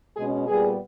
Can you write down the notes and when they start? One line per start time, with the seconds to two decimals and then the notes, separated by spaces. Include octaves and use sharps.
0.16 B2 G#3 C#4 G#4
0.46 A#2 G3 B3 G#4